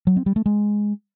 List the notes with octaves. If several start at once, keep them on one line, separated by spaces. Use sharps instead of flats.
F#3
C4
G3
A3
G#3